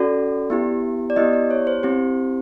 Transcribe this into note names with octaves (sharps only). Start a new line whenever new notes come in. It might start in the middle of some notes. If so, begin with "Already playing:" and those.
Already playing: C#4 F#4 A4 D5
B3 E4 G4
D5
B3 E4 G4 D#5
D5
C#5
C5
C4 E4 G4 C5